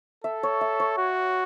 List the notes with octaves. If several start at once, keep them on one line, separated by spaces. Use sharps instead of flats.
A4 E5
C#5
E5
C#5
F#4